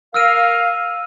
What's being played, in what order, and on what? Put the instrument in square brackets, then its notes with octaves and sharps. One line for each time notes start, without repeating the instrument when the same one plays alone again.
[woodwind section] A#4 F5 [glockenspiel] E6 F6 D#7